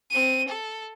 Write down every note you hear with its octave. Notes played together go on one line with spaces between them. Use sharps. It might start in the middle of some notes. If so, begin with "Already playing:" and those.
C4 D#7
A4